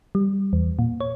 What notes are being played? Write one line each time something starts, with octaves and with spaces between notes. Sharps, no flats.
G3
E2
A#2
C#5